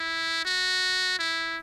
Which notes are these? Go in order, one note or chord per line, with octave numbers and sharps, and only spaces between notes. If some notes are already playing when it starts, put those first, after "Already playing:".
Already playing: E4
F#4
E4